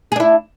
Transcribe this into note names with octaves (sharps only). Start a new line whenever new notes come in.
D4 E4 G#4